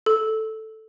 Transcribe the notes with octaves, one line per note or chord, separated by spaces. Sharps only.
A4